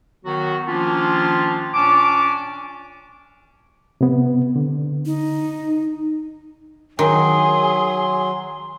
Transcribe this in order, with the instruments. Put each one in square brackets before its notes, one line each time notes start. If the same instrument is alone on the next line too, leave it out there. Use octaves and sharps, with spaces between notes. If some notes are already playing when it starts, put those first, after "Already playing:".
[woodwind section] D#3 F#3 B3 F#4
D#3 F3 A#3 C#4 D4 F4
A#2 C#4 D4 A5 D6
[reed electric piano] C3 B3
D3
[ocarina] D#4
[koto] D#3 [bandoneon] F#3 [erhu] G#4 [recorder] C6